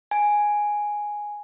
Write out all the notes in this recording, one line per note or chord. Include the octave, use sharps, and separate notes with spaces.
G#5